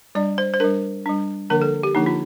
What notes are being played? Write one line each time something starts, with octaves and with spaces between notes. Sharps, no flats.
G3 D4 D5
C5
C5
G3 D4 A#4
G3 D4
D3 F3 A#3 D4 A#4
A4
G4
D3 F3 A#3 D4 D#4
F4